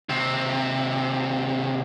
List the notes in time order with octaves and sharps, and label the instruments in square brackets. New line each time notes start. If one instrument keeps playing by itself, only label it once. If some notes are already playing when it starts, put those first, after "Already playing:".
[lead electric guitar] D#2 C3